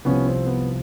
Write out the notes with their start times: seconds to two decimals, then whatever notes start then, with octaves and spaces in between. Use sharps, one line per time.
0.05 C2 C3 F3 B3 C#4
0.26 C4
0.47 B3